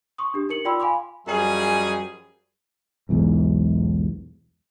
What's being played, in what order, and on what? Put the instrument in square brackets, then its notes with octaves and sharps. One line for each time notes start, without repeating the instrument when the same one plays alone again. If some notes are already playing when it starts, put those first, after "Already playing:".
[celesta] C6 C#6 D#6
D4 G4
D#4 A#4 C#7 F#7
F4 D5 G5 B5 C6 E6
F5 G#5 B5 C6 D6
[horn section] F#2 F3 G3 G#4 D#5
[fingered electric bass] B1 E2 G#2